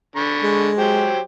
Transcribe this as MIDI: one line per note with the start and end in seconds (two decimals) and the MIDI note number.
0.16 0.69 50
0.16 0.69 83
0.16 0.69 85
0.43 1.10 56
0.78 1.19 54
0.78 1.19 67
0.78 1.19 72